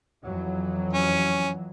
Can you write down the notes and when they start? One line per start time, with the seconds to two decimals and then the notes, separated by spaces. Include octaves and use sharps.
0.24 F2 E3 F#3
0.93 C#4